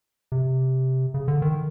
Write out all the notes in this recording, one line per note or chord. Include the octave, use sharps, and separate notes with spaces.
C3
C#3
D3
D#3